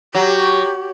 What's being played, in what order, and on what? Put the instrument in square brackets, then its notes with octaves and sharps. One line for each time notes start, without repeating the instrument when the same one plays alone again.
[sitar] F#3 [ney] G4